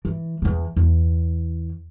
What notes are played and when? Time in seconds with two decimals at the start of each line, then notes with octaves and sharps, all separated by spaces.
0.05 E3
0.42 E2 E3
0.76 E2